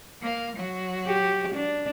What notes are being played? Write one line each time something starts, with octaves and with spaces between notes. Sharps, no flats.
A#3 F5
F#3 F#4
G4
D4